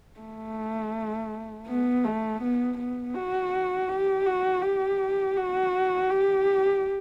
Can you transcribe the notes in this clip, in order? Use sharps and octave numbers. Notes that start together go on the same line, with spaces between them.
A3
B3
A3
B3
B3
F#4
G4
F#4
G4
F#4
G4